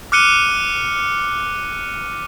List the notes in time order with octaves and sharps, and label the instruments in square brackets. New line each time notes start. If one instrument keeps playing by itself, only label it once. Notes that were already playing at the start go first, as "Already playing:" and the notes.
[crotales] D6 F6 F#6 C#7 D#7 G7